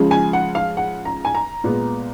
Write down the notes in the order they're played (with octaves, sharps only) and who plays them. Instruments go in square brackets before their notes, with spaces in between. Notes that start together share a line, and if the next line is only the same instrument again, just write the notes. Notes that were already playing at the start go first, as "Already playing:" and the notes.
Already playing: [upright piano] C#3 F3 G#3
G#5
F#5
F5
F#5
A#5
G#5
A#5
A#2 G#3 B3